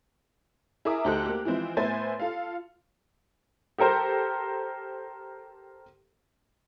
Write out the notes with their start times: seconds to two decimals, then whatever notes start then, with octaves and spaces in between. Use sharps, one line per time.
0.85 E4 G#4 A#4 E5 D6 D#6
1.04 D2 D#4 G4 A4 C5 F#6
1.26 A#3 G4
1.45 E3 F3 G#3 C4 E4
1.77 A2 B3 C5 E5 G#5 A6
2.20 F4 A4 F5
3.78 G4 A4 A#4 C5